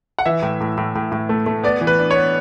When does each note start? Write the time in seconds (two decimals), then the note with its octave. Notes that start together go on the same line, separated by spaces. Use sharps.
0.19 F#5
0.26 E3 E5
0.42 A2
0.60 A2
0.78 A2
0.95 A2
1.12 A2
1.29 A3
1.46 A3
1.63 B3 D5
1.81 E3
1.87 B4
1.98 D4
2.11 C#5
2.16 B3